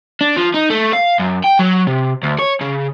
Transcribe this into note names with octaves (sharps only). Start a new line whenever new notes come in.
D4
F3
D#4
A3
F5
F#2
G5
F#3
C3
D2
C#5
C#3